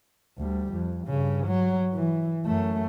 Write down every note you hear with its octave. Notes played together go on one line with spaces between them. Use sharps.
D2 G3
F2
G2 C#3
F#3
E3
F#2 A3